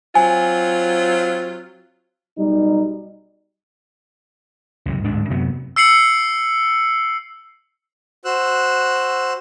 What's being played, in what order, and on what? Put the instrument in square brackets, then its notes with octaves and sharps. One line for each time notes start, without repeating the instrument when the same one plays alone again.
[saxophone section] F#3 C4 F4 [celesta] G#5
[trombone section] B1 G3 D#4
[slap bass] C#2 F#2 A2 C3
D1 D2 G#2 D4
F#2 C3 F#3 B3
[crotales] E6 C7 C#7 F#7
[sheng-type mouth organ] F#4 C5 E6 F#6